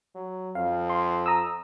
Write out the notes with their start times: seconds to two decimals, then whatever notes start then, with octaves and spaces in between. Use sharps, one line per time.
0.15 F#3
0.55 F2 F5
0.90 C6
1.26 A#5 D#6 E6